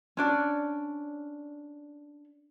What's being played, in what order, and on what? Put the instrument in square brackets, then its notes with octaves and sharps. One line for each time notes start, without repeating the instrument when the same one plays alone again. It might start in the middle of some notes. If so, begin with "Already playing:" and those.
[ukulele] C#4 D4 D5